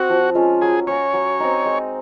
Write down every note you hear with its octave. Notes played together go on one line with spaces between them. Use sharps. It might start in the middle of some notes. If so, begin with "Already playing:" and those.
Already playing: C4 F#4 C5
F3
G#3 C#4 F4
F#3 G#4
C#4 F#4 C#5
F#3
C4 D#4
G#3